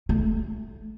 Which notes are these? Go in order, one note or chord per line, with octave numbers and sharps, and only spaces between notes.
A3